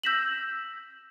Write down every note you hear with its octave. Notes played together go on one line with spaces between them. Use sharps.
E6 G6 A#6 B6 E7 F#7